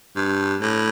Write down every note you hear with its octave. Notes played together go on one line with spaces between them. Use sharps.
G2
A2